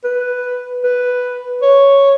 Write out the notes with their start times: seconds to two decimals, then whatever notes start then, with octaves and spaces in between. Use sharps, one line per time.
0.04 B4
0.84 B4
1.62 C#5